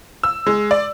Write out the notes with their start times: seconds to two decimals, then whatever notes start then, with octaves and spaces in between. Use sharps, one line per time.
0.23 E6
0.46 G#3
0.71 D5